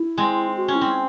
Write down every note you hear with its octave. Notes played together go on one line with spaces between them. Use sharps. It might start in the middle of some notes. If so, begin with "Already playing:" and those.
Already playing: E4
G#3 C4
F#4
C#4
E4
C4